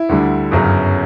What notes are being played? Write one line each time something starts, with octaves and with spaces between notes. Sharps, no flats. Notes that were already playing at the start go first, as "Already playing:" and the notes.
Already playing: E4
D2 D3 G3
G1 F#2 C#3 F#3